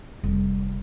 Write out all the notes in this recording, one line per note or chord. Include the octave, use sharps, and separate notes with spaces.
F1 G3